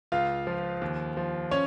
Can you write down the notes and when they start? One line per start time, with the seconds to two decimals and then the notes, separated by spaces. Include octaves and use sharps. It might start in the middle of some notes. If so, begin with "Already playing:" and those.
0.12 C#2 F4 F5
0.47 F3
0.81 D#2
1.17 F3
1.51 C#4 C#5